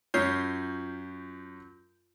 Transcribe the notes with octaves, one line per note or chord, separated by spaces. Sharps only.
F#2 F4 C#5 G6